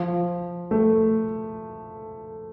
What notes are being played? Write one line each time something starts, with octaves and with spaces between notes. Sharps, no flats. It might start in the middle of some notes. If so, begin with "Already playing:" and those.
Already playing: F3
A3